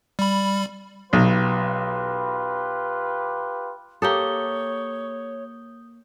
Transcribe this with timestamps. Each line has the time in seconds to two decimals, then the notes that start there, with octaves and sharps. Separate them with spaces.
0.19 G3 B5
1.13 B1 F4 G4 B4
4.02 A#3 G4 A4 C#5 D#6 G6 G7